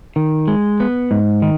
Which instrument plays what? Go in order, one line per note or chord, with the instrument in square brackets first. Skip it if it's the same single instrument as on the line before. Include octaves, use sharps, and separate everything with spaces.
[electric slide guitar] D#3
G#3
B3
G#2
D#3